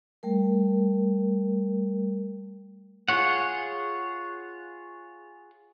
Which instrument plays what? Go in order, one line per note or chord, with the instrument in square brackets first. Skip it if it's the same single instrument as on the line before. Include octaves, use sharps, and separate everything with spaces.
[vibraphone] G3 A3 A#4
[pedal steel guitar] F4 G#4 C#5 F#5